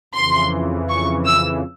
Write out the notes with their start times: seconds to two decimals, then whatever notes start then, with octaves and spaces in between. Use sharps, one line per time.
0.14 F2 C#3 E3 C6
0.89 C#6
1.25 E6